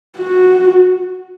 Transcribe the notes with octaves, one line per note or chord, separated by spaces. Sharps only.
F#4